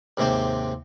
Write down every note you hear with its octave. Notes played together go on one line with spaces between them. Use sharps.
D#2 G#2 C3 C4 C5